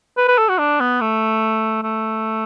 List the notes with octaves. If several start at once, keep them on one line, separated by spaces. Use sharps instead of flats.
B4
B4
A4
F#4
D4
B3
A3
A3